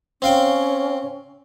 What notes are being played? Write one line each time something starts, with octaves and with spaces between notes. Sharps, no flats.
C4 C#4 F5 G5